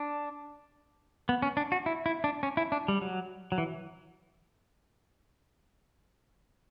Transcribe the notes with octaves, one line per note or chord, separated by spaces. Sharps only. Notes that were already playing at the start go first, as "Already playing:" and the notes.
Already playing: D4
B3
C#4
D4
F#4
E4
E4
D4
C#4
E4
D4
G3
F#3
F#3
E3